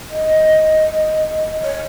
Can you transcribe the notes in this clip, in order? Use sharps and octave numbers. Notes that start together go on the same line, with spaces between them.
D#5
C#5